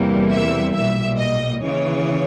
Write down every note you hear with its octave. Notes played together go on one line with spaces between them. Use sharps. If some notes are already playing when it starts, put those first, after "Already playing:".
Already playing: E2 C3 E3 G3 A#3
E5
B1 A#2 G3 E5
D#5
D#2 C#3 E3 C#5